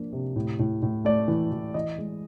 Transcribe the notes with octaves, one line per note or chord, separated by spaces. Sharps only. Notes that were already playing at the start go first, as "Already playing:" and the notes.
Already playing: F3 A#3 D4
C3
A2
A2
A2
A3 D5
E3
E3
E3 D#5
G#3